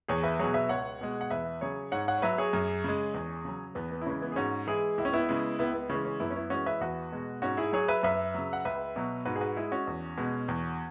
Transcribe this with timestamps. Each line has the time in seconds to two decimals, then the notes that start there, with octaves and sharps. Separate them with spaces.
0.08 E2 G#4 C#5
0.23 B4 E5
0.39 B2 F#3 G#4 C#5
0.54 B4 E5
0.69 C#2 C#5 F#5
1.01 B2 G#3
1.21 F#5
1.30 E2 B4 E5
1.61 C#3 F#3 G#4 C#5
1.92 G#2 C#5 F#5
2.08 C#5 F#5
2.18 C#5
2.22 F#3 B4 E5
2.38 G#4 C#5
2.53 F#2
2.84 C#3 G#3
3.14 E2
3.45 C#3 F#3
3.75 E2 B3
3.91 B3
4.01 E4
4.06 C#3 E3 G#3 C#4
4.21 B3 E4
4.32 G#4
4.36 G#2 C#4 F#4
4.67 E3 G#3 E4 G#4
4.98 C#2 E4
5.05 C#4
5.13 B3 E4
5.29 C#3 G#3
5.59 C#2 B3 E4
5.74 B3
5.90 C#3 E3 G#3 C#4
6.05 C#4
6.20 F#2 B3 E4
6.30 C#4
6.36 B3 E4
6.50 E3 G#3 C#4 F#4
6.66 B4 E5
6.81 E2 F#4 B4
7.12 B2 G#3
7.42 G#2 C#4 F#4
7.57 E4 G#4
7.73 F#3 G#4 C#5
7.88 B4 E5
8.03 F#2 B4 E5
8.34 C#3 F#3
8.53 F#5
8.65 C#2 B4 E5
8.96 B2 F#3
9.25 G#2 F#4 B4
9.36 G#4
9.41 F#4 B4
9.57 G#3 E4 G#4
9.72 C#4 F#4
9.87 E2
10.18 B2 G#3
10.48 E2